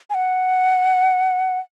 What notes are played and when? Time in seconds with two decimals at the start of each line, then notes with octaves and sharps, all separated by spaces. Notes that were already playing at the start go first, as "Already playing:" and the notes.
0.10 G#5
0.14 F#5